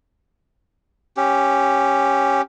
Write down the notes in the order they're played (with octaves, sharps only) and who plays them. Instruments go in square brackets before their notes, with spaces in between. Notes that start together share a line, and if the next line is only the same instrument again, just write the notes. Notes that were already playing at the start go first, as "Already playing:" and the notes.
[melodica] C#4 G4